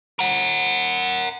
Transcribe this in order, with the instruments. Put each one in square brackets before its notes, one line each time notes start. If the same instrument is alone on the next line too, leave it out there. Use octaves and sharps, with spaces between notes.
[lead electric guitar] A#4 F#5